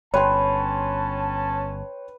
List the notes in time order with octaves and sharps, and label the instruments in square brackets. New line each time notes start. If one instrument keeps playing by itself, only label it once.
[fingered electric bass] G1 [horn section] C#4 A5 [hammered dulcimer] B4 [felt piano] C#5 G5 C6